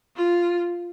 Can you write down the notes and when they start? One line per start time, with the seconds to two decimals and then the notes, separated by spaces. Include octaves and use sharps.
0.16 F4